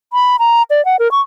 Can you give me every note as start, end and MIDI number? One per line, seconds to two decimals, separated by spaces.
0.13 0.36 83
0.39 0.62 82
0.70 0.84 74
0.85 0.96 78
0.99 1.10 70
1.11 1.21 85